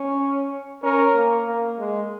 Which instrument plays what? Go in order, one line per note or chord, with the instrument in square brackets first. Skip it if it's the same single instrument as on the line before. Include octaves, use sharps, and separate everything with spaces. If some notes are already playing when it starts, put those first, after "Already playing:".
Already playing: [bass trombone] C#4
[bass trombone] C#4 [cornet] A#4
[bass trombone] A#3
A#3
G#3